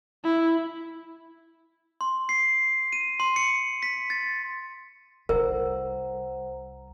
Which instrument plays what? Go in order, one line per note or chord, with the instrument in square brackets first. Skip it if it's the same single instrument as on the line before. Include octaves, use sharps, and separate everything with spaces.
[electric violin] E4
[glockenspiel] C6
C7
D#7
C6
C#7
B6
A6
[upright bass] C2 [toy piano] A#4 [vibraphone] C5 F#5 A#5